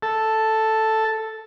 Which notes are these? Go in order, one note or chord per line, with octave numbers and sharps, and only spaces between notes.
A4